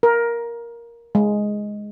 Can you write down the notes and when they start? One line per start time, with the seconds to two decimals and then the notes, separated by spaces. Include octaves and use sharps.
0.03 A#4
1.15 G#3